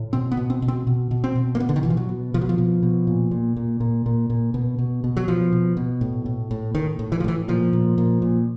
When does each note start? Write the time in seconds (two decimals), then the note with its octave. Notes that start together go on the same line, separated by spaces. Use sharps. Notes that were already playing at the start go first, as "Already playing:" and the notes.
Already playing: A2
0.13 B2 C4
0.32 B3
0.37 B2
0.50 C4
0.62 B2
0.68 C4
0.87 B2
1.11 B2
1.24 C4
1.35 B2
1.55 A#3
1.60 B2 B3
1.69 D3
1.76 D#3
1.83 B2 E3
1.90 F3
1.97 F#3
2.09 B2
2.34 B2 F3
2.41 F#3
2.49 F3
2.58 B2
2.83 B2
3.07 A#2
3.31 A#2
3.56 A#2
3.80 A#2
4.06 A#2
4.30 A#2
4.54 B2
4.79 B2
5.04 B2
5.17 F#3
5.28 B2 F3
5.53 B2
5.77 B2
6.01 A2
6.26 A2
6.51 A2
6.74 A2 D#3
6.99 A2
7.12 E3
7.20 F3
7.24 A2 E3
7.48 A#2 F3
7.73 A#2
7.98 A#2
8.22 A#2